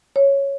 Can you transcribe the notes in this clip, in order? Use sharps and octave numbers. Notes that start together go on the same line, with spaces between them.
C#5